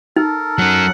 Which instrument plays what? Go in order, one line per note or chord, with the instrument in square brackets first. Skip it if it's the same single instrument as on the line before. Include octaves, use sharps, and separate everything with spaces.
[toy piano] D#4 [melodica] A4 A#4
[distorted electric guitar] F#3 C#4 [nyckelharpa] F#5